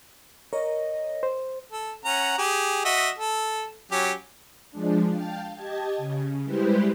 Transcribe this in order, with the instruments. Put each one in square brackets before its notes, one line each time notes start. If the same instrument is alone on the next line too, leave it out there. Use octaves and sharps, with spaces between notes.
[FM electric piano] A#4 C#5 [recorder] D#5
[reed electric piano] C5
[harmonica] A4
C#4 F#5 A#5
G4 G#4
F#4 D#5 E5
A4
F#3 C#4 G4
[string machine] F3 G#3 D4
F5 G5 A5
G4 D#5 A5 G#6
C#3
G3 G#3 E4 G4 B4 C5